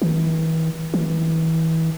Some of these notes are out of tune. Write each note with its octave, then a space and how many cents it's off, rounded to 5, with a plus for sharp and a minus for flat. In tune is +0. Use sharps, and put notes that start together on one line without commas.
E3 -40
E3 -30